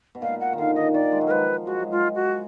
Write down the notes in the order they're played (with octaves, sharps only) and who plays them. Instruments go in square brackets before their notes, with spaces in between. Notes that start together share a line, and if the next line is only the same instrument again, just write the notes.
[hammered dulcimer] B2
[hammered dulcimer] A#2 [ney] F5
[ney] F#5
[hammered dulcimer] D#3
[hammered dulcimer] D3 [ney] F5
[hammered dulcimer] D#3 [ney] D#5
[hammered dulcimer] D#3 [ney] D5
[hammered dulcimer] G#3
F#3
[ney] A#4
[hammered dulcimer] F3 [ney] B4
[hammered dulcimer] G#3 [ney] F#4
[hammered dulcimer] F#3
[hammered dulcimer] G#3 [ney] F4
[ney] F#4